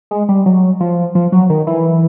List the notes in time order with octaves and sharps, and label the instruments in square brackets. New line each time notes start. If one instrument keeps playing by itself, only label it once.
[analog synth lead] G#3
G3
F#3
F3
F3
F#3
D#3
E3